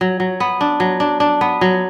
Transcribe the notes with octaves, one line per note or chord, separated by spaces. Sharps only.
F#3
F#3
B3
D4
F#3
D4
D4
B3
F#3